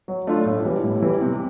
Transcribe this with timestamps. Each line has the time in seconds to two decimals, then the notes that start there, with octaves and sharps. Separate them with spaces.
0.08 F#3
0.27 A3 D4 F4
0.45 A2
0.65 E3 G3
0.84 A2
1.02 E3 G3
1.21 C3